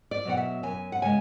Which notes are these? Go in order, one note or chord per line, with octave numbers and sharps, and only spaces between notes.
D5
B2 F#3 F#5
E5
F#2 G#5
F#5
C#3 G#3 G#5